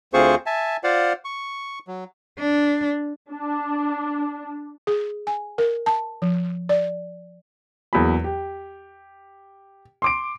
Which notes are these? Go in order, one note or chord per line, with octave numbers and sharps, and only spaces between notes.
D2 C4 F4 G#4 C5 C#6
E5 G#5 A5
F4 C5 D5 F5 F#5
C#6
F#3
D4
D4
G#4
G#5
A#4
A5
F3
D5
E2 F#3 A#3 G#4 B5
G4
C6 D6 D7